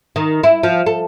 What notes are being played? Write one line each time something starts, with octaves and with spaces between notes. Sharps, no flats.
D#3
E4
F3
A4